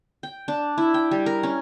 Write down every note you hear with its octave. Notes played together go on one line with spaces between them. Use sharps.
G5
D4
E4
G5
G3
A#4
C#4